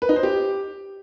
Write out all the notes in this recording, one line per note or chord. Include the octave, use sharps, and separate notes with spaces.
B4
D#4
C5
G4